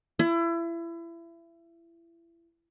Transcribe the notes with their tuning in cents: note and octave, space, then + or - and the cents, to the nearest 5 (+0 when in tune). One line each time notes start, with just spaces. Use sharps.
E4 +30